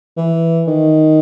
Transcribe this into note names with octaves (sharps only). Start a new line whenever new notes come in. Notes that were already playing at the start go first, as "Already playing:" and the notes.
E3
D#3